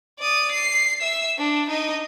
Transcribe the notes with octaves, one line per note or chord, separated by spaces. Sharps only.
D5 D#6
C7
E5 E6
D4
D#4 D#5